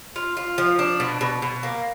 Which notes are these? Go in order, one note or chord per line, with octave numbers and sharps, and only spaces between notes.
F4
F4
F3
D4
B2
B2
B2
A#3